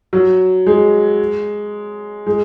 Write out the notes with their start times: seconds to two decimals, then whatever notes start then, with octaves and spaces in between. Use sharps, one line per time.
0.13 F#3
0.66 G#3
2.26 G#3